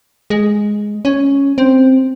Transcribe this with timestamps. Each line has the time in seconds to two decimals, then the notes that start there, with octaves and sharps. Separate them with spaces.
0.30 G#3
1.05 C#4
1.58 C4